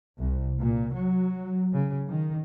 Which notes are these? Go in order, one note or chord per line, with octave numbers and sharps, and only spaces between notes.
C2
A#2
F#3
C#3
D#3